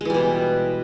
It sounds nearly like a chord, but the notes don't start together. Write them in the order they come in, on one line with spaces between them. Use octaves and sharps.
G#3 E3 G3 B2